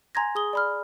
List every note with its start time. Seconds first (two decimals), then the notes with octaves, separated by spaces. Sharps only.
0.15 G#5 A#5 C6 G#6 A#6
0.35 G#4 D#6 G7
0.53 D5 B5 F6